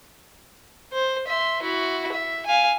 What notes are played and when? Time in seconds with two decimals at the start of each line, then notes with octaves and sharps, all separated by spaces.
0.92 C5
1.27 E5 C6
1.62 E4 F#4
2.12 E5
2.46 F5 G#5